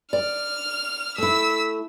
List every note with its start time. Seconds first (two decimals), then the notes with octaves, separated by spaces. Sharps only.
0.13 D5 F6
1.18 A3 E4 E6 B6